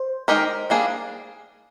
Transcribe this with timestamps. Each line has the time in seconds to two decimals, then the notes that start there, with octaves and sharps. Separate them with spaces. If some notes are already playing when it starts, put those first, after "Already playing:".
Already playing: C5
0.28 D#3 G#3 D#4 G4 A#4
0.70 G3 A#3 D4 G#4